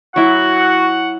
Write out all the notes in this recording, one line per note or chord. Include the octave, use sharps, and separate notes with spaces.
F#3 E4 F#4 F#5